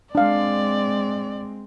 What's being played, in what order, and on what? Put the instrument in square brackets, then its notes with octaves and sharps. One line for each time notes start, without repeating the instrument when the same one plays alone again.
[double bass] G#3 C4 [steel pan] D4 F5 [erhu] D5